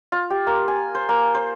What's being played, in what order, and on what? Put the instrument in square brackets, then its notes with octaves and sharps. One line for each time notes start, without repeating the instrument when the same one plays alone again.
[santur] F4
G4
A#3
G#5
C5
A#3
C5